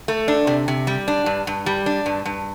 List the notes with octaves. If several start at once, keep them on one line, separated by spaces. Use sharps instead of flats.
A3
D4
C3
C3
G3
D4
G2
G2
G3
D4
G2
G2